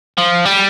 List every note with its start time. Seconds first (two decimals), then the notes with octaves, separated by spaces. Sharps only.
0.18 F3
0.46 G3